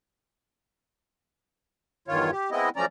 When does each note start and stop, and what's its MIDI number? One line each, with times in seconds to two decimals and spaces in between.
2.08 2.31 40
2.08 2.31 43
2.08 2.31 51
2.08 2.31 65
2.08 2.31 73
2.32 2.50 67
2.51 2.69 56
2.51 2.69 59
2.51 2.69 60
2.51 2.69 64
2.51 2.69 75
2.76 2.85 53
2.76 2.85 54
2.76 2.85 57
2.76 2.85 61
2.76 2.85 74
2.76 2.85 82